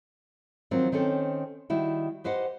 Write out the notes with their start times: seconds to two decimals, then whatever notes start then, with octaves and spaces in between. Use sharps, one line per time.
0.71 D#3 F3 F#3 C4
0.92 D#3 C4 C#4 A4 C#5
1.70 D#3 G3 E4 F#4
2.24 G4 B4 C5 D#5 F#5